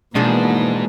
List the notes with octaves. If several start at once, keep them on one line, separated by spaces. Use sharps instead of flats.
G#2 B2 E3 F3 A#3 D4 G#4